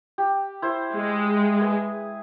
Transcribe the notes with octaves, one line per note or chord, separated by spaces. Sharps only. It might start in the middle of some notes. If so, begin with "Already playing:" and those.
G4
E4 C5
G#3
G#4 B4 G#5